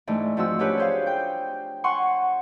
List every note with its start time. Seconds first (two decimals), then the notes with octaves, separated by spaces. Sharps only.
0.07 G#2 E3 A3 D4
0.37 G#2 F3 C4 F#4 E6
0.59 C#4 D4 G4 B4 C#5
0.77 G#4 C5 F5
1.06 G5 G6
1.84 F#5 G#5 C6 C#6